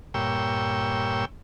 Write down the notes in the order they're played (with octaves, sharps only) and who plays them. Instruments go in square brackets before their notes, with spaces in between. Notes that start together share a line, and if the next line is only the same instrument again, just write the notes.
[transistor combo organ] G2 A#2 C#5 G5 E6